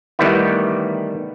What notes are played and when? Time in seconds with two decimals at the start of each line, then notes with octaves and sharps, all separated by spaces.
0.19 D#3 E3 G3 A3 B3 E4